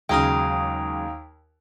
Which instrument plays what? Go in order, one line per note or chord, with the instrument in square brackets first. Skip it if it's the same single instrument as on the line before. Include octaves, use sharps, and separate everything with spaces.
[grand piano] D#2 [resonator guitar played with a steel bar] C#3 F#3 G#3 [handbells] G5 A#5 D#6